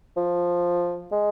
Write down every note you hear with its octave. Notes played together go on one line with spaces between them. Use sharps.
F3
G#3